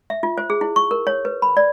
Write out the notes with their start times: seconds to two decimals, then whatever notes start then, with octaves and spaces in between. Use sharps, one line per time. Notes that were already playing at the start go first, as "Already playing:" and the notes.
0.10 E5
0.23 F4
0.38 C5
0.50 G#4
0.61 E4
0.76 C#6
0.91 A#4
1.07 C#5
1.25 B4
1.42 B5
1.57 D5